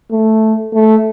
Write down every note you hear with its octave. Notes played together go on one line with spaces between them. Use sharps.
A3
A3